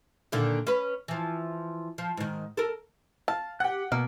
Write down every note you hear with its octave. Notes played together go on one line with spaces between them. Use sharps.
A#2 D3 D#3
C#4 B4
E3 F3
F3
G#2 D#3
A4 A#4
F5 A5
G4 F#5 G5 F#6
B2 A#3 B3 F6